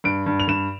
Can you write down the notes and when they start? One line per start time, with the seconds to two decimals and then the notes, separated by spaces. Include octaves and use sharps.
0.04 G2 D7
0.26 G2
0.40 F7
0.48 G2 E7